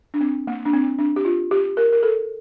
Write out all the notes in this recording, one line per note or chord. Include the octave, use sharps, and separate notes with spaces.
D4
C4
A#3
D4
C4
D4
G4
F4
G4
A#4
A#4
A4